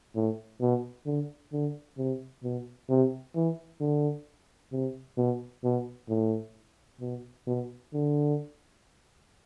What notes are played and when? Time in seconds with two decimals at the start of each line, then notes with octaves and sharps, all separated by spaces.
0.15 A2
0.61 B2
1.06 D3
1.53 D3
1.98 C3
2.43 B2
2.89 C3
3.36 E3
3.80 D3
4.72 C3
5.18 B2
5.64 B2
6.09 A2
7.01 B2
7.47 B2
7.93 D3